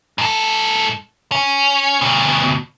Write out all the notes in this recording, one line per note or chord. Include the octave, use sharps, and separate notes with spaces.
G#2 A4
C#4
D2 B2